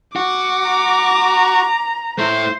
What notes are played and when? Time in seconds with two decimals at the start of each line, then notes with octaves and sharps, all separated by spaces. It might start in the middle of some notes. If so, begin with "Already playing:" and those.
0.16 F#4 D6
0.69 A#5
2.19 A3 E4 C5